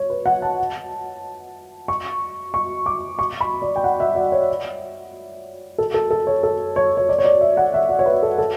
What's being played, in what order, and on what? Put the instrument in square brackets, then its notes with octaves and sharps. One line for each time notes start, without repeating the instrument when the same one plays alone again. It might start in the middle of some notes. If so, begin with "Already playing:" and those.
Already playing: [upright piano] C#5
B4
F#5
A5
C#6
C#6
D6
C#6
B5
D5
G5
F#5
E5
D5
C#5
A4
A4
A4
C#5
A4
C#5
C#5
D5
C#5
D5
E5
F#5
E5
D5
C#5
B4
A4
A4